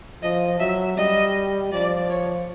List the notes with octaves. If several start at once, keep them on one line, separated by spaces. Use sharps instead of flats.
F3 D#5
F#3 E5
G3 D#5
F3 D5
C#5